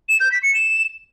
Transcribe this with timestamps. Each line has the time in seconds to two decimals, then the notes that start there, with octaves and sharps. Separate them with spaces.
0.09 E7
0.20 G6
0.32 B6
0.43 C#7
0.54 E7